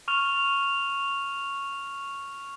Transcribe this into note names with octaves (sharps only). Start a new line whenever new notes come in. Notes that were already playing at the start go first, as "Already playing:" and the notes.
C#6 F6 F7